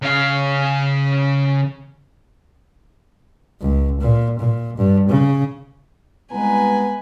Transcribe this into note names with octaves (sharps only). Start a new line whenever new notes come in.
C#3 F5
C#2
A#2
A#2
G2
C#3
C2 G#3 B3 B4 G#5 A#5